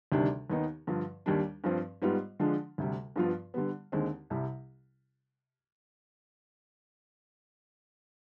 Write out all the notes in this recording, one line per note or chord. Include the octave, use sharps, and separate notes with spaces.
D2 C3 D#3 G3 D4
D#2 D#3 B3 D#4
G2 D3 F3
D#2 D#3 G3 D4
G2 F3 C4
G#2 G3 B3 F4
D3 F3 G#3 D4
D2 C3 G3
G2 F3 B3 F4
D3 G3 B3
D#2 D3 G#3 C4
C2 C3 G3